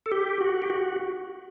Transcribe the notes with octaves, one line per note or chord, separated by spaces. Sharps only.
A4
G4
F#4
G4
F#4